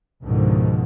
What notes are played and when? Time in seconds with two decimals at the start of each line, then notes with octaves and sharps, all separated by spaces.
0.22 C#2 G#2 B2 D3 D#3 F3